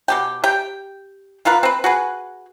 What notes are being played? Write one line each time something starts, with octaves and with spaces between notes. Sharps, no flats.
B2 G4 G5
G4 G5
D3 F4 A#4 B4
C4 B4
F#4 G#4 B4